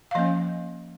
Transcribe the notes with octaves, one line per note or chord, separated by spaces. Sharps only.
F5
F3 A#3 C#4 D#5